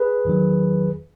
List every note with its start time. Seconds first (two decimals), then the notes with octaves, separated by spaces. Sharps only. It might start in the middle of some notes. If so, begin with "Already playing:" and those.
Already playing: G#4 B4
0.25 E2 D#3 F#3